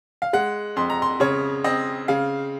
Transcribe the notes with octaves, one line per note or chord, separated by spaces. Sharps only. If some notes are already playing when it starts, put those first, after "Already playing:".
F5
G#3 F#5
F2 C6
A#5
C6
C#3 C#5
C4 D#5
C#3 F5